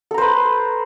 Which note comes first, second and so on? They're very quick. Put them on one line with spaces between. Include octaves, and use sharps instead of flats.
A4 A#5 C5 B4